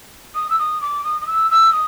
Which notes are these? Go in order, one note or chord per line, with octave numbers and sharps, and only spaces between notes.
D#6
E6
D#6
D6
D#6
D#6
E6
E6
D#6